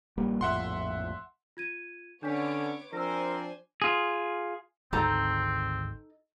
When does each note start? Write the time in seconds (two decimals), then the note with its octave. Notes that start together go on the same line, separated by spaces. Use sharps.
0.18 A#1 G3 A#3
0.41 A#1 F2 A2 E5 F#5 C6
1.57 F4 G#6 D#7
2.23 D3 B3 C#4 D4 C#5 D6 B6
2.93 F3 C4 D4 A#4 C5 G#5 E6 A#6
3.82 F4 G#4
4.93 G#1 D2 C4 D#4 A4 A#5